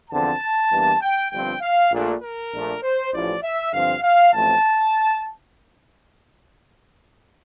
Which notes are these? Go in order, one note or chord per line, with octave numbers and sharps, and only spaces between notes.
E2 D3 F3 C4 A5
E2 E3 G3 A#3 D4
G5
G1 G2 F3 C4 G5
F5
A#1 A#2 A3 D4
A#4
A#1 A#2 A3 D4
C5
A1 A2 F3 D5
E5
G2 D3 F3 C4 F5
F5
A1 A2 F3 A3 C4 A5